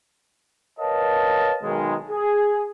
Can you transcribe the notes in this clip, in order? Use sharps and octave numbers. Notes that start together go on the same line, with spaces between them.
A#4 B4 C#5 D#5 F5 A5
B1 D#3 G#3
G#4